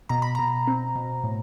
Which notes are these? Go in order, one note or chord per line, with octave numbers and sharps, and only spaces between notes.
B2 A#5
B5
B2 A#5
C4
B2
A2